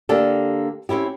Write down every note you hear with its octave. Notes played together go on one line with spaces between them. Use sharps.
D3 A#3 D4 G4 A4
C4 C#4 E4 G4